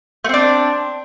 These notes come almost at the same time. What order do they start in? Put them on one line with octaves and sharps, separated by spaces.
A3 C4 D4